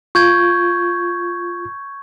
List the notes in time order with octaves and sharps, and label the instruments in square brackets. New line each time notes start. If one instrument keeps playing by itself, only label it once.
[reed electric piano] F4 [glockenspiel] C#6 G6 G#6